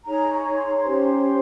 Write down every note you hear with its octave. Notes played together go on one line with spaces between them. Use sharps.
D#4 G#4 C#5 A#5
C#6
C6
A#5
C6
C#4 G4 C5